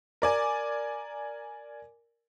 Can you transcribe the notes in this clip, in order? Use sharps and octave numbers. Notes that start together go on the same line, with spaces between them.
A#4 D5 G#5